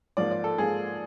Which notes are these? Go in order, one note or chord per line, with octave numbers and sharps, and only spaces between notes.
G#2 F3 A#3 D5
D5
A4
G#2 F3 A#3 G#4